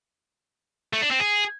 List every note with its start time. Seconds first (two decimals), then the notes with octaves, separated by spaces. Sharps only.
0.93 A3
1.02 D4
1.11 C4
1.20 G#4